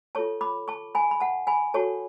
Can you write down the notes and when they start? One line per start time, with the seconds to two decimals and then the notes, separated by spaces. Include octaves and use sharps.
0.15 F4 A4 C#5 A5 C#6
0.41 B5 D6
0.68 A5 C#6
0.95 G#5 B5
1.11 B5
1.21 F#5 A5
1.47 G#5 B5
1.74 F#4 A4 C#5 A5 C#6